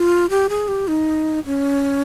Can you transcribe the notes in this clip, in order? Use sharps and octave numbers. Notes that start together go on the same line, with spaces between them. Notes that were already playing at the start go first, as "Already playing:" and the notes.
Already playing: F4
G4
G#4
G4
D#4
C#4